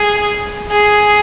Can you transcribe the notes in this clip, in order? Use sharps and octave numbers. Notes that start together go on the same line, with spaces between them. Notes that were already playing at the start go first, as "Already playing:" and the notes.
Already playing: G#4
G#4